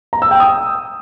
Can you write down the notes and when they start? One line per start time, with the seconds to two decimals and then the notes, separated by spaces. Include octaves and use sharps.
0.13 A#5
0.22 E6
0.31 G5
0.40 D#6